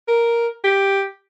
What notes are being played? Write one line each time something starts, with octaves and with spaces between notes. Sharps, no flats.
A#4
G4